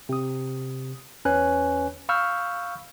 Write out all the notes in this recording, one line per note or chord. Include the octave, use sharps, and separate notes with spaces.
C3 D#6
E2 C#4 B4 G#5 F#6
F5 B5 C#6 E6 F6 G6